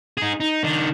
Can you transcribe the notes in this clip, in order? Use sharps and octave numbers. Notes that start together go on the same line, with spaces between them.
D#4 G#4
D#4
D#3 D4